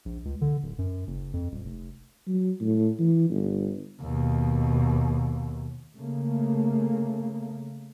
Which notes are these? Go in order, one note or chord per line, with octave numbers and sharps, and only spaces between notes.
A#1
C#2
D3
D1
F#2
F#1
F2
D#1
F1
F#3
A2
E3
G1
D#2 B2
C#3 A3 A#3